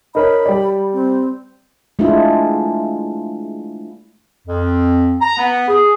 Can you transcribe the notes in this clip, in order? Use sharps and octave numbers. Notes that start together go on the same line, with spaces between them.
D#4 A#4 C#5 B5
G3 D5
C4
G#3 A3 D4 E4 F4
F2
A#5
B3
G#4